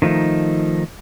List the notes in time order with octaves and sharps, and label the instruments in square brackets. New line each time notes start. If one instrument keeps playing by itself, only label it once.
[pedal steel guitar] D#3 F3 A3 D#4